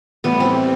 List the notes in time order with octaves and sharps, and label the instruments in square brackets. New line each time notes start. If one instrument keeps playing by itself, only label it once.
[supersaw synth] A2 E3 G3 [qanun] B3
[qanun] C4